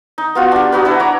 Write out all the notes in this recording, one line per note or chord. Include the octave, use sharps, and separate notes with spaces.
D#4
B3 F4 F#4
D4 G4
D#4 F#4 B4
D4 E4 B4
C#5 A#5 D6